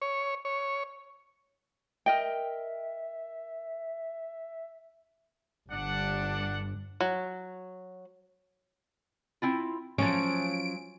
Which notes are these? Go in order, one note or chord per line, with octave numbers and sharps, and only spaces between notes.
C#5
C#5
A#4 D#5 E5 G5
G1 G2 D4 F#5
F#3
C4 E4 F4
F3 F#3 A3 C#4 C#5 D7